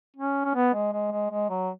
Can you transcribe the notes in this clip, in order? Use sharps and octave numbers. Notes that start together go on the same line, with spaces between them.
C#4
C#4
B3
G#3
G#3
G#3
G#3
F#3